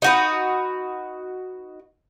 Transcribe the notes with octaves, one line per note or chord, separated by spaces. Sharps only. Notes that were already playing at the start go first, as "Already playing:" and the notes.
D#4 F#4 B4